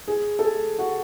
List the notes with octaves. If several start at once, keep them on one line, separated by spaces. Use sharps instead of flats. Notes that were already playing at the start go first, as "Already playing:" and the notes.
G#4
A4
G#4
F#4